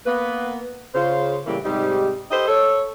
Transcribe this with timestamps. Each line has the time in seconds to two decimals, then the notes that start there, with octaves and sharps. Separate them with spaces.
0.07 A#3 B3 B4
0.95 C#3 F4 C5
1.46 A2 C#3 E3 G3 A#3
1.65 G#2 C3 G3 G#3 D#4 G4
2.31 G4 A4 B4 C5 D#5
2.48 A4 C#5